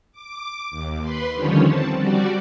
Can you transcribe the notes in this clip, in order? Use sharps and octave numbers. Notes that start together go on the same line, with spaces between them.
D6
D#2
B4 B5 C6
D3 D#3 F3 G3 C#4 C#5
C4 A5
G3 F#4 D5